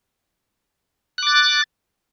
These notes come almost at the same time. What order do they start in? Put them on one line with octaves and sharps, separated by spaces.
F#6 D6 A6